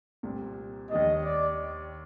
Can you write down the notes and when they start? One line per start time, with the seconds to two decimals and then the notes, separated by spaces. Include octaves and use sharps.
0.23 C2 A#2 G3 C4
0.90 D#2 D#3 G3 A#3 D4 D#5
1.24 D5